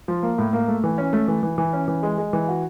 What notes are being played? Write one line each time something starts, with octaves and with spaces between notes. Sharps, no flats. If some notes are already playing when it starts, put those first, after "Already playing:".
F3
A#3
A2
A#3
A3
E3
C#4
A3
E3
E3
E3
C#4
E3
G#3
G#3
E3
F#4